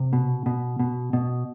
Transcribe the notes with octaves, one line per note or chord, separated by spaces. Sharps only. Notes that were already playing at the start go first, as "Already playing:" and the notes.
Already playing: C3
B2
B2
B2
B2